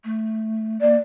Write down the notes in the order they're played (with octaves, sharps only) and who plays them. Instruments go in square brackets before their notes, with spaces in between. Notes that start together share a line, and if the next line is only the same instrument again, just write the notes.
[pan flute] A3
[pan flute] A#3 [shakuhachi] D5